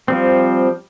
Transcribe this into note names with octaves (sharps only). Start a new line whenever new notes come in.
F3 G3 C4